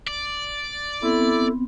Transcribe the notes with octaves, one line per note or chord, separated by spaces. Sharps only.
D5
B3 C4 E4 A4